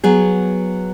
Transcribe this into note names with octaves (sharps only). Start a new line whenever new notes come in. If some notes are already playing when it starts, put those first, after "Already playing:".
F#3 B3 G#4